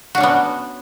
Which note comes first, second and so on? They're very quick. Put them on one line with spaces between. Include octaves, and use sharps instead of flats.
F#4 D4 C#4 B3